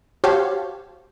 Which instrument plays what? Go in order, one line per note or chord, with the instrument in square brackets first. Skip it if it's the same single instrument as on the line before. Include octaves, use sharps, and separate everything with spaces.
[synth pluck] F#4 G4 C5 C#5 F5 A5